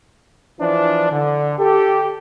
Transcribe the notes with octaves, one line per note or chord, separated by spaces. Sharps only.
E3 F3 D4
D3
G4 A4